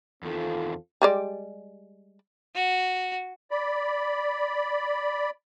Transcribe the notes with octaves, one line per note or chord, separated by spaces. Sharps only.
E2 D#3 C4 F4 A4
G3 G#3 D5
F#4
D5 B5